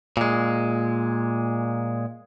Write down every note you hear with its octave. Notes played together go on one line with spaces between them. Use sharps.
A#2 G#3